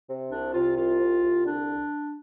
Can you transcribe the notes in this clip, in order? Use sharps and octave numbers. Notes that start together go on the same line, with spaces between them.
C3
C2 D4
C3 F4
C2 F4
C3
C2
D3 D4